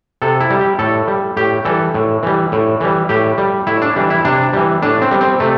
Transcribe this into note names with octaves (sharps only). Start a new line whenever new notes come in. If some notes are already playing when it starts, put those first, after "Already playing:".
C3 A4
E4
G3
G4
A2 A4
G3
A2 G4
E3 G3 A4
A2
E3 G3
A2
E3 G3
A2 G4
G3
A2 E4
D4
E3 G3
E4
C3 D4
E3 G3
A2 D4
C4
G3
C4
C3 A3